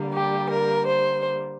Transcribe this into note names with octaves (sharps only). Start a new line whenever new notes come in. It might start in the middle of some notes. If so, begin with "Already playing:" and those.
Already playing: D3 G3 A#3
G4
A#4
C5